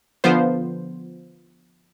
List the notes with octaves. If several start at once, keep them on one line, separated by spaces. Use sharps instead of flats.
D3 F3 B3 F4 C5